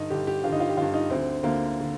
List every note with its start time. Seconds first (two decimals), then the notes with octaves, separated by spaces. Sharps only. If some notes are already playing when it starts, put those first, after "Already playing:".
Already playing: G2 D3 D#4
0.10 G2 D3 G4
0.27 G4
0.43 G2 D3 F4
0.52 D#4
0.60 F4
0.69 G4
0.77 G2 D3 F4
0.94 D#4
1.10 D2 D3 C4
1.43 D2 D3 A#3
1.81 D3